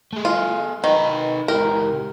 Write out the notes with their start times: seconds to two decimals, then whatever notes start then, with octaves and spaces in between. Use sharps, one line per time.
0.13 A3 G#4
0.25 F4
0.84 D#3 D#4 B4
1.48 C#2 G4 A#4